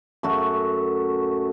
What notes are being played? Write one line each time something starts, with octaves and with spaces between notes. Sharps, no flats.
F#2 A3 F#4